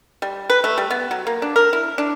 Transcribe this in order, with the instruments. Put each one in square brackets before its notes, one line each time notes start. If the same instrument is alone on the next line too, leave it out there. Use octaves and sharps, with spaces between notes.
[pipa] G3
B4
A3
G3
B3
F#3
A#3
D4
A#4
E4
D4